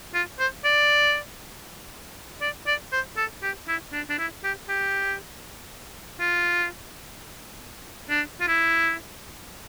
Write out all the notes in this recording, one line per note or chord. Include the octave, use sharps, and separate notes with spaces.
F4
C5
D5
D5
D5
C5
A4
G4
E4
D4
D4
E4
G4
G4
F4
D4
F4
E4